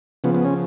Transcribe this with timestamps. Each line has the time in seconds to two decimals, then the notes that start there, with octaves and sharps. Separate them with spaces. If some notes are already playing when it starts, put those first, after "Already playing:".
0.24 C#3 F3 B3
0.35 B3
0.45 C#4